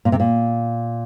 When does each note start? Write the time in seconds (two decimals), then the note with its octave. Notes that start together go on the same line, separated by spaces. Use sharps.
0.05 A#2
0.12 C3
0.20 A#2